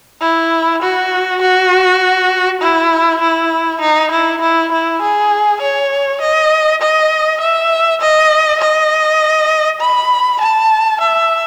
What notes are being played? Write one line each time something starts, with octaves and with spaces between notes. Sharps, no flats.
E4
F#4
F#4
E4
E4
D#4
E4
E4
E4
G#4
C#5
D#5
D#5
E5
D#5
D#5
B5
A5
E5